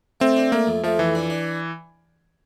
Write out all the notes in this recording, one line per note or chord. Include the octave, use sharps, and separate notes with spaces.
A3 C4
D4
A3 A#3
F2
F3 A3
F2 E3
D4
D4